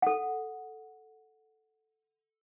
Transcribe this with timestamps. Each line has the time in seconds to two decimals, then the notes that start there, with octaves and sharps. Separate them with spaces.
0.02 A4 F#5